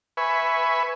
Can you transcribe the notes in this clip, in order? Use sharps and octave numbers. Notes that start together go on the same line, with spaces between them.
B4 E5 G#5 B5 C#6